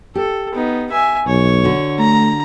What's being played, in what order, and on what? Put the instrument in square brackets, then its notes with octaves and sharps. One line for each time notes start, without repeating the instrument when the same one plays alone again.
[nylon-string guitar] G4 [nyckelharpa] A4
[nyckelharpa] B3 D#4
E5 G#5
[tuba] B1 [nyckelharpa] C#5
[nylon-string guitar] D3 F#4
[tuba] A3 [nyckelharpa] A#5